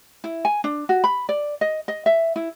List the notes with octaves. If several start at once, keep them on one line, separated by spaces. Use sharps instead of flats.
E4
G#5
D4
F#4
B5
D5
D#5
D#5
E5
E4